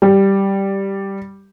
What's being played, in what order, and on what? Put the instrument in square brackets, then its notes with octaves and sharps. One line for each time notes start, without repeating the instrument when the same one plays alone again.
[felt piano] G3